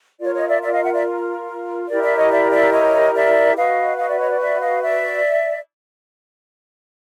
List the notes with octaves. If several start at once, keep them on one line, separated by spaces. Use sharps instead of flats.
F4 A#4 C#5 D5
C#5 D#5
D5 E5
D5 E5
D#5 F5
E5 F#5
D5 E5
E4 G4 A#4 D5
D5 E5
C#5 D#5
D5 E5
D5 E5
C#5 D#5
D5 E5
F#4 B4 D#5 F5
D#5 F5
D5 E5
C#5 D#5
D5
D5 E5
D#5 F5
D5 E5